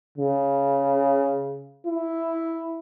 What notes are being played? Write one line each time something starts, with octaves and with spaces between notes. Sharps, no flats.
C#3
E4